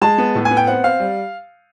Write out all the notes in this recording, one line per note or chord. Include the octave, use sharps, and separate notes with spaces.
G#3 A5
B3
A2
G#5
B3
G5
C4 F#5
C4 F5
G3